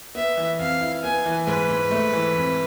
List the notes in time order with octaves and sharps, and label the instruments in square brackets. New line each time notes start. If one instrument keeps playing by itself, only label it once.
[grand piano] B3 [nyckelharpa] E5
[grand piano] E3
[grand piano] F2 [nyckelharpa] F5
[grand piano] E4
[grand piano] B3 [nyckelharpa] G#5
[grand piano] E3
[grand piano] G#2 [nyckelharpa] B4
[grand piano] G#2
A3
E3
F2